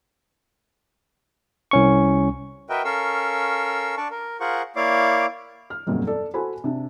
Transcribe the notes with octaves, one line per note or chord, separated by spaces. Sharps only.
C2 C#4 C#6
F#4 A#4 B4 D#5 E5 G5
C#4 A4 A#4 F5 C#6 E6
D4 D5 A5 C#6
A#4
F4 G#4 A#4 C5 F#5 C#6
A#3 E4 C#5 D5 F5 D6
F6
G1 F2 A#2 C#3 F#3
A4 D5
F#4 A4 C5 G#5 B5
C3 D4